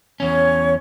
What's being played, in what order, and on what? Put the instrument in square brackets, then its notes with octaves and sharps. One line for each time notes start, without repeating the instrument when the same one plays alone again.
[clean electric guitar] E2 C#4 [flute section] C#5